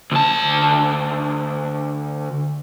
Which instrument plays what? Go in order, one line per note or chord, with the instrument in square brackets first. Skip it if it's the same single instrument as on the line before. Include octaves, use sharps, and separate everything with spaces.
[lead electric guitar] D2 A5